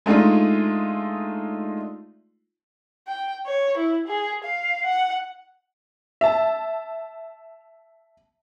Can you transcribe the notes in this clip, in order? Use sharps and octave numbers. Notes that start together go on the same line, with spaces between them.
G#3 A3 D4 D#4 F4
G5
C#5
E4
G#4
F5
F#5
E5 A5